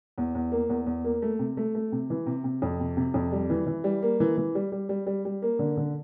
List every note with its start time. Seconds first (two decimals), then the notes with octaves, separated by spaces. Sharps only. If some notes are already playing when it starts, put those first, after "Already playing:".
0.18 E2
0.35 E2
0.52 A#3
0.69 E2
0.86 E2
1.04 A#3
1.22 A3
1.39 C3
1.57 A3
1.75 A3
1.92 C3
2.10 E3
2.26 C3
2.44 C3
2.62 F2
2.80 C3
2.97 C3
3.14 F2
3.32 G3
3.50 E3
3.67 E3
3.84 G3
4.02 A#3
4.20 E3
4.37 E3
4.55 G3
4.72 G3
4.89 G3
5.07 G3
5.25 G3
5.42 A#3
5.59 D3
5.77 D3